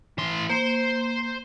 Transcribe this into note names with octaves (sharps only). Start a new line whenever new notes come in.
E3 C6
A#3 C5